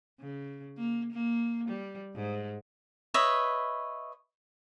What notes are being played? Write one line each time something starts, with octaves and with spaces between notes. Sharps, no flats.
C#3
A#3
A#3
G3
G#2
B4 C#5 D#5 E5